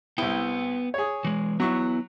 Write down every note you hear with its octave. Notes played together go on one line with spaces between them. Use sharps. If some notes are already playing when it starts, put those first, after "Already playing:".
C2 B3 E4 G5
G#4 C#5
E3 G#3
F#3 B3 E4 C#6